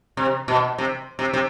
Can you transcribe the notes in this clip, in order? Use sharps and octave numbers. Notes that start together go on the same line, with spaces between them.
C3
B2
C3
C3
C3